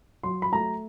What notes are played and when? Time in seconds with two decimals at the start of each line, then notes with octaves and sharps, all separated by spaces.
0.23 F#3 C6
0.42 B5
0.52 A3 A#5